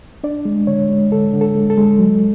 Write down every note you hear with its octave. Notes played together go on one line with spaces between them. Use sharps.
D4 D5
G#3
D3 C#5
G#3
D3 A4
D3
A4
G#3
A4
G#3
F#3